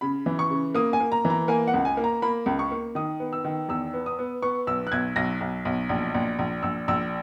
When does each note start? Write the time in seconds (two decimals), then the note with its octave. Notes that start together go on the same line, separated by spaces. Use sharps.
0.01 C#3 B5
0.26 E3
0.39 C#6
0.51 C#3
0.75 A#3 D#6
0.93 G#5
1.00 A#3
1.12 A#5
1.25 E3
1.30 A#5
1.48 A#3 G#5
1.67 F#5
1.73 C#2
1.85 G#5
1.97 A#3
2.04 A#5
2.22 A#3 B5
2.46 C#2
2.59 C#6
2.71 A#3
2.95 D#3 D#6
3.20 B3
3.33 E6
3.44 D#3
3.68 E2 E6
3.93 B3
4.06 D#6
4.19 B3
4.42 B3 C#6
4.67 B1 E6
4.87 F#6
4.92 B1 G#6
5.16 B1 A#6
5.40 B1
5.65 B1
5.89 A#1
6.14 A#1
6.39 A#1
6.63 A#1 E6
6.88 A#1 E6